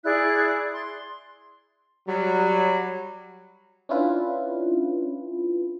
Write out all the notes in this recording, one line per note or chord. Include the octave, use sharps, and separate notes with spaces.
E4 G#4 D5 F#6
C6
F#3 G3
C#4 D4 E4 F4 B4